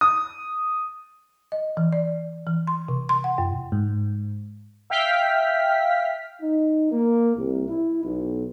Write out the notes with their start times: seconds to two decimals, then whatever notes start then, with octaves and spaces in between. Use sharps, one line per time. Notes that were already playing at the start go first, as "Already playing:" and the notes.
0.01 D#6
1.52 D#5
1.77 E3
1.93 D5
2.47 E3
2.67 C6
2.88 C3
3.09 C6
3.24 F#5
3.38 F#2
3.72 G#2
4.90 E5 F5 G5 F6 B6
6.42 D#4
6.91 A#3
7.37 C2
7.68 E4
8.04 B1